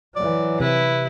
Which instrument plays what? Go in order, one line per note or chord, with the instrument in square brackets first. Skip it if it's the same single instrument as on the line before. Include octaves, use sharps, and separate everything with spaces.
[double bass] E3 F#3 [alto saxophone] D5
[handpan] C3 [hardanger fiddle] E4 [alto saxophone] B4